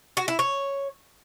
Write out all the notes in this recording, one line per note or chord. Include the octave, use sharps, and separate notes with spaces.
F#4
E4
C#5